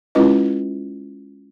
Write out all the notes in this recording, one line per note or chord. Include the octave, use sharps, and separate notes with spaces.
G#3 C#4 E4 F4 B4 D#5